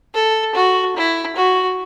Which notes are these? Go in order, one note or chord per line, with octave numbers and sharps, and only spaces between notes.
A4
F#4
E4
F#4